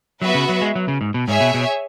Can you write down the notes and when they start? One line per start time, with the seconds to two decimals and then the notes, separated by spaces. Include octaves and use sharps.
0.22 F#3 B3 F#4 B4 E5
0.35 C#3
0.49 F#3
0.61 G#3
0.75 F#3
0.88 C#3
1.01 G#2
1.14 B2
1.28 G#2 G#4 C#5 E5 G#5
1.40 B2
1.54 B2